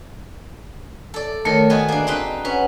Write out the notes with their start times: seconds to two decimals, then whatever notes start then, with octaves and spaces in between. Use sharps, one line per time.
1.14 A4 D5
1.45 D#3 A3 A#4 C#5
1.70 B3 F#4 G#4 D#5
1.88 A#3 D4
2.07 C4 D#4 B4
2.45 C#4 B4 F#5